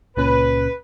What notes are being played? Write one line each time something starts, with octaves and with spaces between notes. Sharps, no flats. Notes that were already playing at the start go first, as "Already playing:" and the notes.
C#2 A#2 C#4 B4